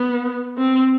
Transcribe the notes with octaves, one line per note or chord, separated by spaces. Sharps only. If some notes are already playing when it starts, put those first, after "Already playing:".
Already playing: B3
C4